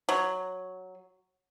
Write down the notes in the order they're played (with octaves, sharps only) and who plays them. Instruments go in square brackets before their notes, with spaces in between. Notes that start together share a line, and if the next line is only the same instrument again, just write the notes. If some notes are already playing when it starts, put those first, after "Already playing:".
[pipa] F#3